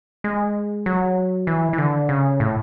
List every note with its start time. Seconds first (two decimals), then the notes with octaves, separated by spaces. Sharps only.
0.24 G#3
0.86 F#3
1.47 E3
1.73 E3
1.78 D3
2.09 C#3
2.40 A2